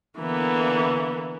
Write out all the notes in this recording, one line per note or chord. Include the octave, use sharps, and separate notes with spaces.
D3 E3 A#3 B3